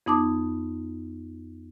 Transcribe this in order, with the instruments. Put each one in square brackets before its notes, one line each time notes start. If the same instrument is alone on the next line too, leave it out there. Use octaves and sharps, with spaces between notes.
[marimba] F2 B3 D#4 A5 D6